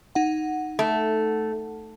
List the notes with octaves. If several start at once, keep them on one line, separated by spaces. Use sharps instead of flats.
D#4 F#5
A3